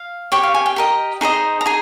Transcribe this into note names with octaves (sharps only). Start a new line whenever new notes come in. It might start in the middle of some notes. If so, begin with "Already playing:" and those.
Already playing: F5
G4 C#5 G5
F5
G#5
G5
G4 A#4 D#5
D#4 G#4 C5 D#5
A#5
D#4 G#4 G#5